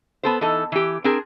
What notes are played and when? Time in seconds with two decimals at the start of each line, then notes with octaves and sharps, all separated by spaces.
0.23 B3 A4 C5
0.41 E3 D#4 A4
0.72 E3 G4
1.04 C4 D4 G#4 A#4